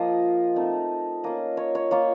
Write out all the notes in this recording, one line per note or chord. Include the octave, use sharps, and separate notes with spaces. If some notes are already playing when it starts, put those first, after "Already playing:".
Already playing: F3 A#3 F4 D#5
A3 C4 D#4
A#3 C#4 F4 D#5
C#5
C#5
A#3 F4 C#5